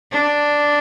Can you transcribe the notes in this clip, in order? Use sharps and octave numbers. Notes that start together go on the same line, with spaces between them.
D4